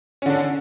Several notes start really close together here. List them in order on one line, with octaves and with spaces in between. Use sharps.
C#4 D3 D4